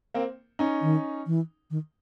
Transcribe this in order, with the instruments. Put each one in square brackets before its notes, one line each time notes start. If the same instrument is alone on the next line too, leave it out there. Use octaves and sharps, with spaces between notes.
[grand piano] A#3 C4
C#4 D#4
[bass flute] D#3
E3
D#3